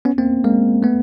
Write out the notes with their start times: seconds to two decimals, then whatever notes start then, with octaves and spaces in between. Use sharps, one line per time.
0.05 B3 C#4
0.18 A#3 C4
0.44 G#3 A#3
0.83 A3 B3